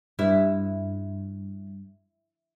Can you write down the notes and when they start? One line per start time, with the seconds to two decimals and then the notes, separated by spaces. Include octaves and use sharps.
0.19 G2 E4